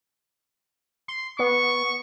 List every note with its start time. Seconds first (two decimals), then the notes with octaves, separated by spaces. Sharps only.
1.08 C6
1.39 B3 C#6